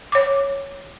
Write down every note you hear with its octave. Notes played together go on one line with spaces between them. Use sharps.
C#5 D6